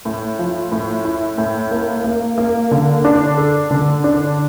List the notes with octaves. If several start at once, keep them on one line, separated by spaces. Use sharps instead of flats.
A2
F3
A2
E4
A2
A#3
A#3
A#3
D3
D4
A4
D3
D4